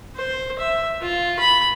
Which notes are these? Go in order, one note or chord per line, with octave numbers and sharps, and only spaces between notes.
C5
E5
F4
B5